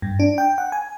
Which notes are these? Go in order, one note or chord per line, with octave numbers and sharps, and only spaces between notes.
G2
D4
G5
F#5
G#5